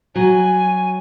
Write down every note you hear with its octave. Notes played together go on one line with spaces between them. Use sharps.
F#3 G#5